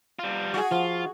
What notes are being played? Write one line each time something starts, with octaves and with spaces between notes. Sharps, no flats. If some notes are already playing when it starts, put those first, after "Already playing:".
G3 F4
F#4 G#4
F3 F4